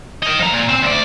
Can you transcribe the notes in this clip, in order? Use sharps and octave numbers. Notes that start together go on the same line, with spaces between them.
D#4 A#4
F3 A#5
A#2
C4
D2 D5